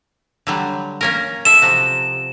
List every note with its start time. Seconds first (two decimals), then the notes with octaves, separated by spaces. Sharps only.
0.47 D3 F#3 G3
1.01 A#3 C#4 A#4
1.45 A4 E5 E7
1.62 C3 F3 F#4